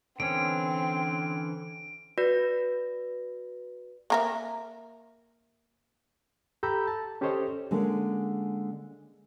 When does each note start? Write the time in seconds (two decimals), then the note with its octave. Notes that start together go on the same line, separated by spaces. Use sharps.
0.20 D3 E3 C4 C#4 D7
2.18 F#4 B4 D5 A#6
4.10 A#3 A#4 E5
6.63 G4 A4 A#5 B5 E6 G6
6.88 A5
7.21 C#4 G4 A4 C5 C#5 D#5
7.71 D3 G#3 A#3 C#4